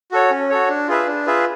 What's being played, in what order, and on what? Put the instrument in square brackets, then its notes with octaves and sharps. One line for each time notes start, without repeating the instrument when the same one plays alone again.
[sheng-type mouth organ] F#4 A4 C#5
C#4
F#4 A4 C#5
D4
F4 G#4 B4 E5
D4
F4 G#4 B4 E5